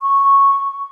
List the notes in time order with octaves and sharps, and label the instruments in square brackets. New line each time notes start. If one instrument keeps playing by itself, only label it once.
[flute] C#6